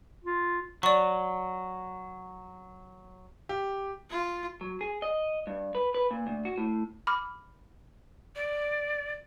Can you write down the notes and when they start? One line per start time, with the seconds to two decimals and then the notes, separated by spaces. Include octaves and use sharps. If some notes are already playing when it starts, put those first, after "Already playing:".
0.24 F4
0.83 F#3 D5 C#6
3.49 G4
4.10 F4
4.61 F#3
4.81 G#4
5.02 D#5
5.47 G2
5.75 B4
5.94 B4
6.11 A#2
6.27 D2
6.45 F#4
6.58 A2
7.07 B5 D6 F6
8.35 D5